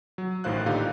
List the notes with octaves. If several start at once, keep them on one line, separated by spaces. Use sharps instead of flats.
F#3
A1 A2 D#3 C5 F5 F#6
A#2 D3 D#4 G4 F5